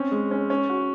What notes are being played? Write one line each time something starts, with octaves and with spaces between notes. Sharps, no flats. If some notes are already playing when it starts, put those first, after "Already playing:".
Already playing: C4 C#4
G#3
C#4
C#4
F#4